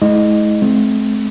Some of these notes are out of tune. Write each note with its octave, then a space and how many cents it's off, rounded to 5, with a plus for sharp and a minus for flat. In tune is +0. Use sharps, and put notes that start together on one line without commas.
G#3 +35 E4 -35 D#5 -20
A3 -45 C4 +0